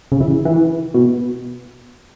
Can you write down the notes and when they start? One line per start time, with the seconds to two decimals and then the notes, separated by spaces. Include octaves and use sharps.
0.12 C#3
0.20 E3
0.45 E3
0.94 B2